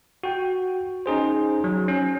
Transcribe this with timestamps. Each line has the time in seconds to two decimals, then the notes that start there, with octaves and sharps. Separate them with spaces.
0.23 F#4 G5
1.06 C#4 D#4 G#4 C5
1.64 F#3
1.88 C#4